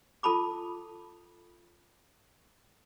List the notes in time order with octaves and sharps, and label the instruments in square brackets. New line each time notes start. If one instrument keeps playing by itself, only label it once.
[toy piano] F4 A4 A5 B5 D6